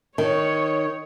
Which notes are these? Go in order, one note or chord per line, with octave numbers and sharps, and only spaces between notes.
D#3 C#5